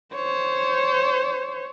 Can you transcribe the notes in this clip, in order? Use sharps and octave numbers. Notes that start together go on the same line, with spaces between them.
C5 C#5